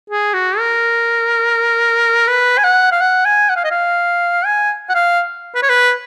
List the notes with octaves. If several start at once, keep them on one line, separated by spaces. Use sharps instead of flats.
G#4
F#4
A#4
B4
G#5
F#5
F5
F#5
G#5
F#5
F5
D#5
F5
G#5
F#5
F5
B4
C#5
B4